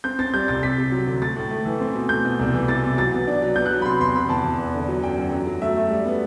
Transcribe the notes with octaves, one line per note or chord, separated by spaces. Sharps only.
C4 G6
C4 A6
G3 G6
C2 A6
C3 B6
C3
F#3
D2
A3 A6
A2
A3
E3
C4
B2
A3 G6
B2
C2
E3
C3 A6
C3
F#3 A6
B3
D4
F#3
B3 G6
F#6
F#3
B5
C3 C6
E2 C6
C3 B5
E2 A5
E2
E2
D3
F#3
F#2 G5
F#2
F#3
F#3
A3 E5
A3
G3
B3